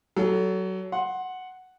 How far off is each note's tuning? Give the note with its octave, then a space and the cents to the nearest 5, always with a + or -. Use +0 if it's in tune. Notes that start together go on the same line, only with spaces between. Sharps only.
F#3 +25 A4 +0
F#5 +0 C6 +20